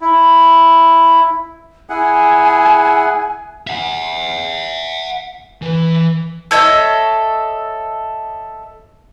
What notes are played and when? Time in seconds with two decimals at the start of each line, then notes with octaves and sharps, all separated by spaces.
0.01 E4
1.90 E4 G#4 F#5 G#5
3.67 E5 F#5
5.62 E3
6.51 A4 C#5 D#5 E5